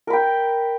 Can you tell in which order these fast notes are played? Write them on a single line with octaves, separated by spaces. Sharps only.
A#4 B5 G5